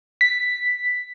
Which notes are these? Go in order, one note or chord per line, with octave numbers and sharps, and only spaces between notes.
B6